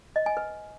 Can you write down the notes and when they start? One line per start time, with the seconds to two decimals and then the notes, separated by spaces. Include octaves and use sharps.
0.16 D#5
0.26 G#5
0.37 B4